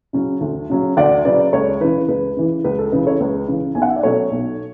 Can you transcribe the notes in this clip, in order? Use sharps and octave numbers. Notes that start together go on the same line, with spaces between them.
C#3 F#3 C#4
D2
C#3 F#3 C#4
D2 D5 F#5
C#3 F#3 C#4 B4 D5
C#2 A4 C#5
C#3 E3 B4
C#2 B4
C#3 E3
C#2 B4
A4
C#3 E3 B4
A4 C#5
C#2 B4
C#3 E3
B1 G#5
F#5
E5
D5
B2 F#3 A3 C#4 A4 C#5
B1